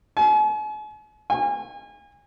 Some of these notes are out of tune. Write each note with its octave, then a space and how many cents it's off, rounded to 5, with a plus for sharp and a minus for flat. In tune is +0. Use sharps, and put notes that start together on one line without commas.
G#5 +45
G#5 -30